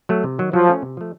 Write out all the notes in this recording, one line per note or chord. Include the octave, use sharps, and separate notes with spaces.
F#3 A3
C3
D#3 F#3
F3 F#3
A3 C#4 F4
C3
F3 A3